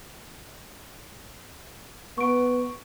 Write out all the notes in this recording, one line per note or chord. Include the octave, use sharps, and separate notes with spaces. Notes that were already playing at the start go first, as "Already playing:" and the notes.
B3 C#6 D7